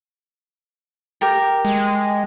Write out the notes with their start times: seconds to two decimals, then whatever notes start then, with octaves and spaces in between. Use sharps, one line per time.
1.21 G4 A#4 G5
1.65 G#3